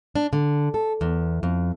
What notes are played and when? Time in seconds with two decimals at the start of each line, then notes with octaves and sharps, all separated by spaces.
0.15 D4
0.33 D3
0.74 A4
1.01 E2
1.43 F2